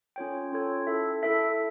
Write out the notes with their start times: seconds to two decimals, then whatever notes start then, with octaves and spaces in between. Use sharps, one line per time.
0.16 C#4 F4 A4 C#5 G5
0.52 C#4 F4 A4 C#5 G5
0.87 E4 A4 E5
1.23 E4 A4 E5